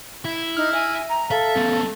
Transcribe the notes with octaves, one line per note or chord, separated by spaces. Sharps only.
E4
D#4 F6
E5 G#5
A#5
A4 E5 F5
A3 B3